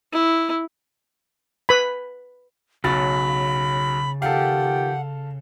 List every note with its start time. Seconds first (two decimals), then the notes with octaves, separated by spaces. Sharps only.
0.12 E4
1.69 B4 B5
2.84 B1 C#3 F#3 B5 A6
4.22 D#3 F3 G4 A4 F5 F#5